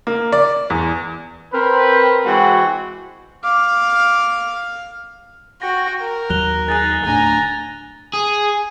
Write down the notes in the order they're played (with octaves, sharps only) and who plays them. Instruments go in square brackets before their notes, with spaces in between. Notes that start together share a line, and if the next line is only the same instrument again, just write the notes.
[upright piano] A#3
D5
E2
[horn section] C4 A#4 B4
E3 G#3 C4 F#4
[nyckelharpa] F5 [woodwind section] D6
[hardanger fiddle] F#4 G5 [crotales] A#6
[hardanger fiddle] A#4
[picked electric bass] D#2 F#3 [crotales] F#6 F7 G7
[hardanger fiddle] D#4 G#4 [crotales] F#6 A6
[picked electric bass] D1 A2 D4 [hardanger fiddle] G#5 A#5
[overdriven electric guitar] G#4